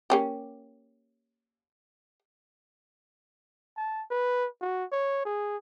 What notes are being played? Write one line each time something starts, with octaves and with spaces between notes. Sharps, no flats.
A#3 C#4 G4
A5
B4
F#4
C#5
G#4